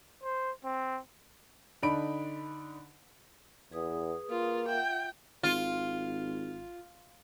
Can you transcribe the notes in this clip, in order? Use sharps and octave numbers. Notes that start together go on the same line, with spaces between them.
C5
C4
D3 D4 D#4 B5 D7
E2 G#4 B4 D#6
A#3 F4
F4 E5 F#5 G5
G#1 F4